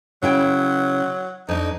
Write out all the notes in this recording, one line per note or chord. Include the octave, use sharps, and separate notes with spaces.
C#3 F#3 E4 G5
F2 D4 D#4